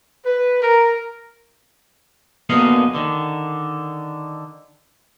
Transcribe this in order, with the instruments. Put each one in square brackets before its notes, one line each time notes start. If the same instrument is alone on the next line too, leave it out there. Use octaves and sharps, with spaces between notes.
[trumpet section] B4
A#4
[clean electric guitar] F#2 D3 A#3 B3 D#5 F5
D3 D#3